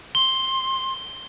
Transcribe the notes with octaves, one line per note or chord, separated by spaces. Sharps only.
C6 G7